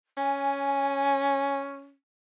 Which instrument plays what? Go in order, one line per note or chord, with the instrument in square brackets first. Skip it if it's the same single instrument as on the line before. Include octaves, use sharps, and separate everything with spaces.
[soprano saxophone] C#4 [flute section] G#5